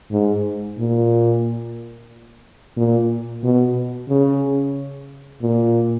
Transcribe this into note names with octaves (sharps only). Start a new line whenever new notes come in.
G#2
A#2
A#2
B2
C#3
A#2